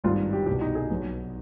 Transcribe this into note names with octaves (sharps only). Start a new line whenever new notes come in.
G#1 G2 D#3 F4
G4
C2 B2 G4
D#4
G#4
B1 B2